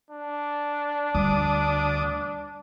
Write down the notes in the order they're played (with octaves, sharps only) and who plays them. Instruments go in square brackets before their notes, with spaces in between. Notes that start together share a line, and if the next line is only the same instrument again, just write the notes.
[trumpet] D4
[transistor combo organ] D2 D6 D#6 [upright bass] G3